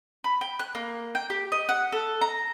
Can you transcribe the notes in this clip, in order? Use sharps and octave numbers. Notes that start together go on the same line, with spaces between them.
B5
G5
F#6
A#3
G5
G4
D#5
F#5
A4
A#5